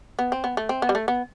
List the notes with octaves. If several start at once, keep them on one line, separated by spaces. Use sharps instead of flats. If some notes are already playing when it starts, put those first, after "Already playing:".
B3
C4
B3
A3
C4
B3
G3
A3
B3